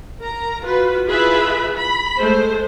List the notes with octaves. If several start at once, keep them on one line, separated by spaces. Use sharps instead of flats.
A#4 A#5
F4 F#4 B4
E4 F4 G#4 B4 E5 B5
B5
G#3 A3 C5